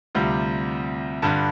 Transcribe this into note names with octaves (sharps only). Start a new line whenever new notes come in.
D2 C3 G3 F4
G2 D3 G3